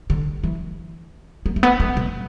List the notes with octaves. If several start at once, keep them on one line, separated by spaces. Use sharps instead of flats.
D3
E3
B3
A3
B3
A3
B2